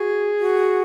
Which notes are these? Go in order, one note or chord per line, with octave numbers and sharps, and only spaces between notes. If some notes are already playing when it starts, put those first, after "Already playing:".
Already playing: F#4 G#4
F#4